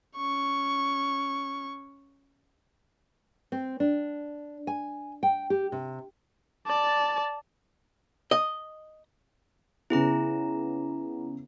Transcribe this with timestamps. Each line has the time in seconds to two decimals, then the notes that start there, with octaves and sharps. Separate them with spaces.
0.17 C#4 C#6
3.52 C4
3.80 D4
4.67 G#5
5.23 G5
5.50 G4
5.72 C3
6.67 D5 A5
8.31 D#5
9.90 C#3 B3 E4 G#4 A#5